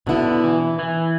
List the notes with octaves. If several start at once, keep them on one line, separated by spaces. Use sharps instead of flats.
B2 D3 B3 E4
E3
E3